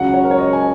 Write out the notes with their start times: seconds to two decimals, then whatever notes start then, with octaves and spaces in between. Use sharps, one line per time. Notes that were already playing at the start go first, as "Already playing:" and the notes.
Already playing: C#2 C#3 F#3 F#5
0.14 C#5
0.24 A#4
0.31 C#5
0.39 D#5
0.53 G#5